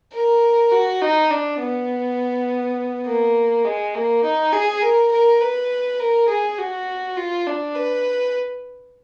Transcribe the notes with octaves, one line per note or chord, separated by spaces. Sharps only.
A#4
F#4
D#4
D4
B3
A#3
G#3
A#3
D#4
G#4
A#4
A#4
B4
A#4
G#4
F#4
F4
D4
B4